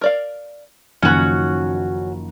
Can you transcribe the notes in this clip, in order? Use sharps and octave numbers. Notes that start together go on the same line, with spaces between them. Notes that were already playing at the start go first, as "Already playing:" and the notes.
A#4 D5 F5
F#1 D#3 F3 C#4 D#4 F#4 B5